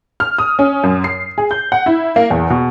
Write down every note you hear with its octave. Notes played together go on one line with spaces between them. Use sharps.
F6
D#6
C#4
F#2
C7
G#4
G6
F#5
E4
A#3
E2
B2